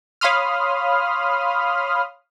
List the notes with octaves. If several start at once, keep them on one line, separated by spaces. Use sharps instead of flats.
C#5 F5 B5 C6 D#6 F6